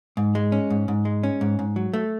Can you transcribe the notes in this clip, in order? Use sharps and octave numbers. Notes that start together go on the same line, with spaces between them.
G#2
G#3
C#4
G#2
G#2
G#3
C#4
G#2
G#2
F#3
A3